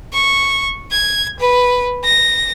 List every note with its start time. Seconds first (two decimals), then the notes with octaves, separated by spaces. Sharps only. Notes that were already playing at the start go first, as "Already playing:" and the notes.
0.13 C#6
0.91 G#6
1.39 B4
2.04 A#6